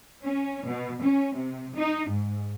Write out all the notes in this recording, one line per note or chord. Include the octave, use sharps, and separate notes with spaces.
C#4
B2
C#4
C3
D#4
G#2